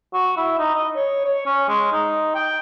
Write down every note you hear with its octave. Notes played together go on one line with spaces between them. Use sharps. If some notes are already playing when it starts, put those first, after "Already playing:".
F#4
E4
D#4
D#5
C#5
C#5
C#4
G#3
D#4
G5